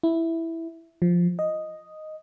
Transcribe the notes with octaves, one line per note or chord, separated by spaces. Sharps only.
E4
F3
D#5